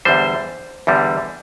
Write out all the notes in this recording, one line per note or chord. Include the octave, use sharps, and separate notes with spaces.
E2 D3 G3 C5
E2 D3 G3